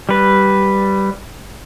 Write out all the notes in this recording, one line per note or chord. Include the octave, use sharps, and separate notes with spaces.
G3 B4